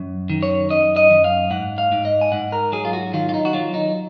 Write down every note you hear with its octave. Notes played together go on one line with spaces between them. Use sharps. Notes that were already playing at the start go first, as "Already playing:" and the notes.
Already playing: F#2
D#3
C#5
F#2 D#5
D#5
F#2
F5
G#2 F#5
F5
G#2
D#5
G#5
G#2 F#5
A#4
F#3 G#4
F4
F#4
D#3 F4
F4
D#4
F#4
F#3 F4
D#4